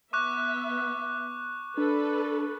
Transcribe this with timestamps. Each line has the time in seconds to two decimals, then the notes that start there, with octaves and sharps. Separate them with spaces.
0.13 B3 E5 C#6 D6 F#6
1.77 D4 A4 B4